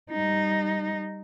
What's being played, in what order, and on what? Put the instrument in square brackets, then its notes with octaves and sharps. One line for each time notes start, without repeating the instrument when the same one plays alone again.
[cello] G3 D#4